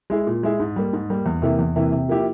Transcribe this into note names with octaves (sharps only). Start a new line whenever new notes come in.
G#3 E4 G#4
A#2
G#3 E4 G#4
G#2
G3 A#3
G#2
G3 A#3
E2
C3 E3 A#3 E4
E2
C3 E3 A#3 E4
C3
F3 A#3 E4 G4